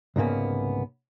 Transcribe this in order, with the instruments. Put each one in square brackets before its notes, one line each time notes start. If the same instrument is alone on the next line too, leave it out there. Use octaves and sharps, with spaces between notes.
[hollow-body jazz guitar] C2 G#2 C#3 A#3 B3